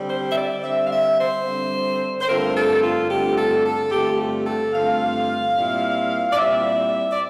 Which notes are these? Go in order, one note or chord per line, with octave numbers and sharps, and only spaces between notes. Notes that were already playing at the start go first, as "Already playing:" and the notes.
Already playing: D3 G3 C4
C5
E5
D5
D3 G3 C4 E5
F5
E5
C5
D3 G3 C4
C5
G2 D3 A3 C4 F4 A#4
A4
F4
G2 D3 A3 C4 F4 G4
A4
A4
G2 D3 A3 C4 F4 G4
G4
A4
G2 D3 A3 C4 F4 F5
A#2 G3 C4 E4
D5
A#2 G3 C4 E4 E5
D5